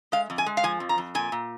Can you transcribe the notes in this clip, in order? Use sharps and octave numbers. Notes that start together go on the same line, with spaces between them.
G#3 F5
F2
G#5
G#3
F5
F3 G#5
F2
A#5
F2
A#2 G#5
A#2